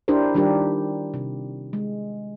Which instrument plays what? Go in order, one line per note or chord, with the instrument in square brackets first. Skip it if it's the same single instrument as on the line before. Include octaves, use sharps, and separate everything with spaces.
[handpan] D4 E4 G4 A#4 C5
D#3 G3 D4 F4 G4 A#4
C3
G#3